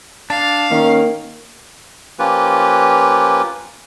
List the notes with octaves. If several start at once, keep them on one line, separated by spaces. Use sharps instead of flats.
D4 F5 A5
D#3 A#3 C#4
F3 A#3 C#4 F4 G4 B4